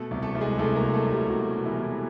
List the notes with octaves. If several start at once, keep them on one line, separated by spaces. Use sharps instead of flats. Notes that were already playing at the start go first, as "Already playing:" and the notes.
Already playing: B2 A3 A4
C2
A3 A4
C2
G#3 G#4
C2 A3 A4
A#3 A#4
F#3
A3 A4
C2
G3 G4
B2 F#3 F#4
B2
E3 E4
B2